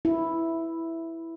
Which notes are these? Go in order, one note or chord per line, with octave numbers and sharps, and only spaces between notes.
E4